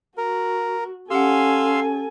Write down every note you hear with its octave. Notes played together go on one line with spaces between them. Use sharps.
F#4 A#4
C#4 G4 A4 F5 F#5 G#5 C6 E6